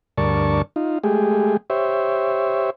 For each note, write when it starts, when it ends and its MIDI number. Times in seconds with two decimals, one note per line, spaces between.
0.18 0.62 38
0.18 0.62 43
0.18 0.62 70
0.18 0.62 74
0.18 0.62 81
0.18 0.62 85
0.76 0.99 63
0.76 0.99 65
1.04 1.57 56
1.04 1.57 57
1.04 1.57 67
1.04 1.57 68
1.70 2.70 67
1.70 2.70 72
1.70 2.70 73
1.70 2.70 76